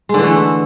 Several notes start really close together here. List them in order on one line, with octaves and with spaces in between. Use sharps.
G#3 D3 E3 A3